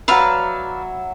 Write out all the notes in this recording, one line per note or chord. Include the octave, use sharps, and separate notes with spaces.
F#3 B4 D5 E5 F5